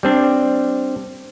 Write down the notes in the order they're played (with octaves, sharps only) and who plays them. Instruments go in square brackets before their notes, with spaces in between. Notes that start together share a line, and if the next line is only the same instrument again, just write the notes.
[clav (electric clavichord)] G3 C4 D4